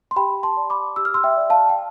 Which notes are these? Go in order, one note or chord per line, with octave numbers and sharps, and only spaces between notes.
C6
G4 G5 B5
A5 C6
D5
B5 D6
G4 E6
F6
C6 E6
E5 G5
D5
F5 A5
G5